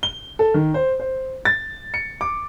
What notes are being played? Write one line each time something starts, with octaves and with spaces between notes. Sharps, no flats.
G7
A4
D#3
C5
C5
A6
C#7
D6